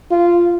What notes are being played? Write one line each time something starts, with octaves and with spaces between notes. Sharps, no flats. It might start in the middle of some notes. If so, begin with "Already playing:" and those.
F4